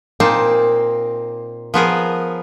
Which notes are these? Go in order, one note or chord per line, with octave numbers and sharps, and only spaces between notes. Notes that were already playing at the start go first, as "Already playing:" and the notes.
A#2 A#3 C4 D#4 A5
F3 B3 G#4 A#4